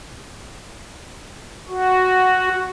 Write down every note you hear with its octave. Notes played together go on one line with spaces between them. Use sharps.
F#4